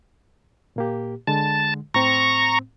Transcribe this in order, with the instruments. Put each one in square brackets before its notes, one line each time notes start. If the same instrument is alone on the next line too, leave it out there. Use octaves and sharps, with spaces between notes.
[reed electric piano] A#2 A#3 G4
[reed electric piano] D3 G#3 [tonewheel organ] A5
[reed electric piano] A2 C4 [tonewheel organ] A#5 C#6